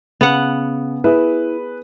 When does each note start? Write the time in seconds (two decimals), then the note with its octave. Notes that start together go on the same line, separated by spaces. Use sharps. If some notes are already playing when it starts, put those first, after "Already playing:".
0.21 C#3 B3 F#5
1.04 E4 G#4 B4